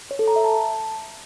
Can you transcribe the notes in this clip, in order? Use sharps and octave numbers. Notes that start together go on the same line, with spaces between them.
C#5
A4
A#5
E5
A5